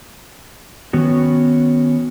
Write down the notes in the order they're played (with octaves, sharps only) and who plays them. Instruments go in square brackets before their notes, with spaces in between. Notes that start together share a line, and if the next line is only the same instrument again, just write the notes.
[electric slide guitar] D#3 B3 C#4 F#4